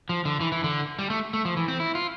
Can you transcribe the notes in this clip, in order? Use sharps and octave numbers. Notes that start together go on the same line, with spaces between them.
F3
D3
E3
E3
D3
G3
A3
A3
F3
E3
C4
E4
F4